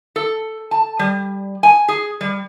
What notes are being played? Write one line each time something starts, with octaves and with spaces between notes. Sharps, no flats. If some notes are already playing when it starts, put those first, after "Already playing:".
A4
A5
G3
G#5
G#4
G3